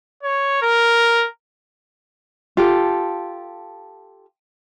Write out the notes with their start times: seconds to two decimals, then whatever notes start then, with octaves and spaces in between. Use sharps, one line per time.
0.23 C#5
0.62 A#4
2.57 F4 G4 A4